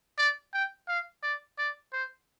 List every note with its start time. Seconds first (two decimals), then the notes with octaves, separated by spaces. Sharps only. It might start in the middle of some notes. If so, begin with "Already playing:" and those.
0.18 D5
0.54 G5
0.89 F5
1.23 D5
1.58 D5
1.93 C5